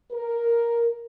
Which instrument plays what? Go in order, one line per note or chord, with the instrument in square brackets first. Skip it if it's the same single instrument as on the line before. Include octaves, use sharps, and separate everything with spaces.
[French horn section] A#4